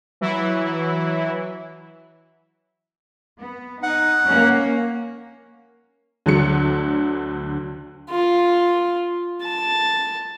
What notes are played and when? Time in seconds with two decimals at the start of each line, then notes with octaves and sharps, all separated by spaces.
0.21 E3 F#3 E4
3.39 B3
3.83 D#4 F#5
4.24 A#3 C#4
6.26 D2 D3 F#3 C#7
8.10 F4
9.43 A5